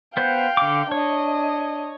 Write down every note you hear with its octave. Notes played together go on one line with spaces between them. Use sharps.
B3 C5 F5 G5
D3 D6
D4 C#5 D#5